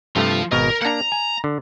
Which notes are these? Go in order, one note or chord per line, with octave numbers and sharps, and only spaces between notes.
G2 C3 F3 A3 F4
G#1 B2 A#4 D#5
A#3 D4 F#5 A#5
G#5
D3